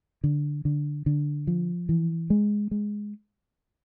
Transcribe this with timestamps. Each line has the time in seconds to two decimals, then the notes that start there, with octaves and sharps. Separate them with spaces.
0.24 D3
0.65 D3
1.06 D3
1.47 F3
1.89 E3
2.30 G#3
2.71 G#3